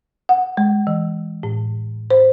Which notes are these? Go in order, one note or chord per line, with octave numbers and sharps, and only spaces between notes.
F#5
G#3
E3
A2
C5